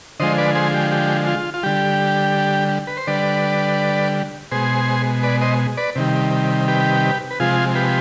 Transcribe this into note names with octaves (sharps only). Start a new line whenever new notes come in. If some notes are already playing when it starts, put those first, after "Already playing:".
D3 F3 G#3 C5 D#5
B4 D5
G#4 C5
G4
G4
F4
F4
D3 G3 G4
B4
C5
D3 G3 B4 D5
B2 G#3 G#4 C5
B4 D5
C5 D#5
B4 D5
C3 D#3 G3
G4 B4
B4
C3 F3 G#3 F4 G#4
G4 B4